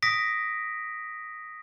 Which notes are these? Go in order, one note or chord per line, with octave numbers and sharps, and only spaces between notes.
D#6 A#6 B6 D7